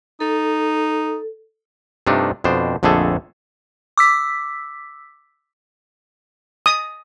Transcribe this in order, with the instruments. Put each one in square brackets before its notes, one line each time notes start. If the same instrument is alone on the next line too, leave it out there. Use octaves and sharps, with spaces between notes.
[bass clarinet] D#4 [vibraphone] A4
[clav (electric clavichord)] G2 C3 A3 D4 D#4 F4
F2 B2 D4 C5
A#1 F2 D3 A3 G#4 A4
[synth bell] D6 E6 B6
[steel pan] D#6